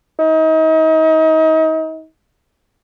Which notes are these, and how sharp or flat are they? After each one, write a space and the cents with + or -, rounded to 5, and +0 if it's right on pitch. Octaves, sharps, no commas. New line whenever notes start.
D#4 +35